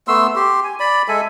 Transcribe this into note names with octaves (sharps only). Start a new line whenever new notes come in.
A3 B3 C6 E6
G4 C6
G#5
D5 B5
G#3 A4 E5 G#5